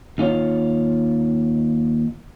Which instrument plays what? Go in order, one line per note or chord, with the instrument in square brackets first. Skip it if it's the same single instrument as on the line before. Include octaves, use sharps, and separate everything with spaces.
[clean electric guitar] D#2 D#4 F4 C#5 F5